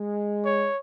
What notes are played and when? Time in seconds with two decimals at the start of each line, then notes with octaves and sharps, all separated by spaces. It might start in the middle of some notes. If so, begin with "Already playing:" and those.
Already playing: G#3
0.45 C#5